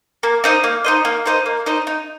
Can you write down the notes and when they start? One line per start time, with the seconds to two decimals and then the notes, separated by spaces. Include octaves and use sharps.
0.23 A#3
0.44 D#4 C5 D#5
0.64 A#3
0.84 D#4 C5 D#5
1.05 A#3
1.26 D#4 C5 D#5
1.46 A#3
1.66 D#4 C5 D#5
1.87 D#4